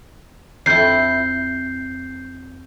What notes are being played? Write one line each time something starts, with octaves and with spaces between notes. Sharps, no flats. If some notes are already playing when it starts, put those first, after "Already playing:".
F2 E4 G6 C7